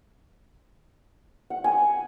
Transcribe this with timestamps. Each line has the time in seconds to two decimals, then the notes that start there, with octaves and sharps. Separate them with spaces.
1.50 F#5
1.64 G#5